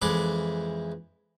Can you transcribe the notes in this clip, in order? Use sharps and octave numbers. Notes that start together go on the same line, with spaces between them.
F2 E3 G#3 B4 D6